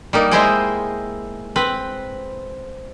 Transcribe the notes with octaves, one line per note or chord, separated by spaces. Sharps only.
G3 A#3 D#4
G#3 E4 C5 D#5 G5 G#5
C4 B4